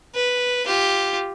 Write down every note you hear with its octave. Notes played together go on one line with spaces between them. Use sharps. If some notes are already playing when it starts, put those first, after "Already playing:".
B4
F4 G4